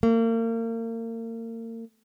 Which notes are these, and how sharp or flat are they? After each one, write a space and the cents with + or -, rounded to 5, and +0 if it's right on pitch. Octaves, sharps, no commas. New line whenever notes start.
A#3 -35